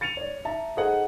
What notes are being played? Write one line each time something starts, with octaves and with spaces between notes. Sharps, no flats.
A6 C#7 D#7 F7
C#5 D5
E5 A5 A#5
D#4 G#4 A4 C5 D#5 F#5